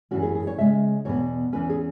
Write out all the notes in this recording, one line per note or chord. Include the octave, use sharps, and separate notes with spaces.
F#2 E3 C#4 F#4
G#4
G#4
C#5
C#3 G#3 C#4 E5
E2 B2 B3 C#5
E2 E3 C#4 B4
G#4